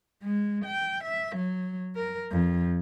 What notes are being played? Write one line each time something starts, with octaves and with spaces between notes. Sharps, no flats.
G#3
G5
E5
F#3
A#4
F2